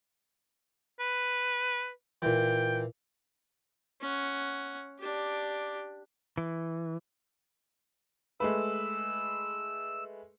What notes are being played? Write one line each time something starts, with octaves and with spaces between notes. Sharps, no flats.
B4
A#2 E3 G5
C#4 F#5
D4 G4
E3
G#3 A3 B4 E6